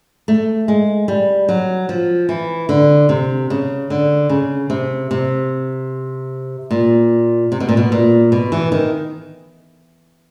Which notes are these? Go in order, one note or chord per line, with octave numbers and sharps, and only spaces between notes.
A3
G#3
G3
F#3
F3
E3
D3
C3
C#3
D3
C#3
C3
C3
A#2
C3
B2
A#2
B2
A#2
B2
E3
D#3